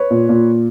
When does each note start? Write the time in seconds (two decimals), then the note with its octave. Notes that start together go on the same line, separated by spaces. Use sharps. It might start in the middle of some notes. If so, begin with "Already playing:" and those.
Already playing: B4 C#5
0.11 A#2
0.29 A#2